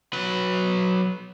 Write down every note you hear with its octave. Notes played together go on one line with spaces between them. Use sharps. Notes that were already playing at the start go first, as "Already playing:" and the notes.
F#3 B4